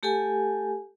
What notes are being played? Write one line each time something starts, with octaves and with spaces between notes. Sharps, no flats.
A3 G4 A4 F#5 G#5